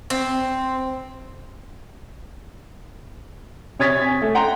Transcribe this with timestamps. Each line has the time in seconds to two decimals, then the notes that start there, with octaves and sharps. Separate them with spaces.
0.10 C4
3.79 C3 C#5 D#6 G#6 A6 B6
4.04 G#5
4.22 A3
4.35 F#5 G5 A#5 C6